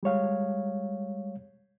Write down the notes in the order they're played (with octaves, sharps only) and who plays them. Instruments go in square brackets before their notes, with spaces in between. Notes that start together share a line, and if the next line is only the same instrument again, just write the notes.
[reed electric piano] G3 G#3 C#5 F5